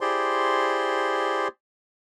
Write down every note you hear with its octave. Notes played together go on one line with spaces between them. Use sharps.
E4 G4 G#4 C5 D5 C6